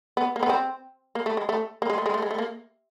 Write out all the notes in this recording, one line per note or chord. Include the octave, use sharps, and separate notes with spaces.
B3
A#3
B3
C4
A#3
A3
G#3
A3
A#3
G#3
A3
G#3
A3
G#3
A3
A#3